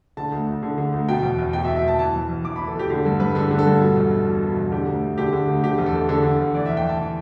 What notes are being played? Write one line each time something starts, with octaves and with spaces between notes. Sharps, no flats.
D3 A5
D2
D2
D3
D3
D2
B2 G5
E2
E2
B2 G5
E5
B2
E5
E2 A5
E3 A5
E2
E2
E3 D6
E3 B5
A4
E2 G4
D3 G4
G2 A4
G2 B4
D3 A4
D3
A4
G2
B2
E2
E2
B2
B2
E2
D3 G4
D2
D2
D3 G4
D3
D2
D3 G4
E2
A4
E2
D3 A4
D3
E2
E3 D5
E2 E5
G5
E2 A5
E3